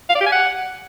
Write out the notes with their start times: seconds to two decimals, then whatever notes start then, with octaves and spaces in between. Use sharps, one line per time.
0.09 F5
0.15 D5
0.21 G4
0.26 G#5
0.32 F#5